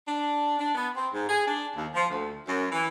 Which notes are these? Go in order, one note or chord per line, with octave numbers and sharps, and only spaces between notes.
D4
D4
B3
C4
G#2
G#4
D4
D#2
F3
D2
F#2
E3